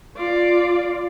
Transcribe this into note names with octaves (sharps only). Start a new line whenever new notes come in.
F4 D5